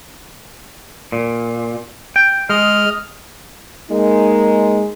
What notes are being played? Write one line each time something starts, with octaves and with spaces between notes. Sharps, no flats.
A#2
G5
G#3 D#5 F6
G#3 A#3 D#4